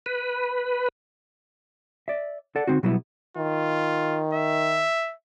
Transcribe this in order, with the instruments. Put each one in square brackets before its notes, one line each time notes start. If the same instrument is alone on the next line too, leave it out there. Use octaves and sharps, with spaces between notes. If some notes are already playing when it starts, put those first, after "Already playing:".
[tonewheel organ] B4
[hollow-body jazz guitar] D5 E5
A4 D5 F#5
D3 C4 D#4 F#4
B2 F#3 G3 B3 E4
[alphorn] D#3 [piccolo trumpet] F4
[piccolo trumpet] E5